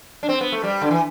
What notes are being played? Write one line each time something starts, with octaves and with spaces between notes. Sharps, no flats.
D4
C4
B3
A3
G3
D3
E3